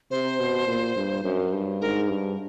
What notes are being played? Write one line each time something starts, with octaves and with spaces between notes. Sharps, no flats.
C3 C5
B2
A#2
G2
F#2
G2
G#2 A#4
G2